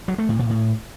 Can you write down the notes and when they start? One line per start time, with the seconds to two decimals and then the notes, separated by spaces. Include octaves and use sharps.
0.08 F#3
0.18 A3
0.29 A2
0.39 A#2
0.50 A2